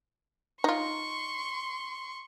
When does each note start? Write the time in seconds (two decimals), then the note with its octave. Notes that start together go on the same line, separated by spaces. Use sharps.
0.64 D#4 F4 C6 C#6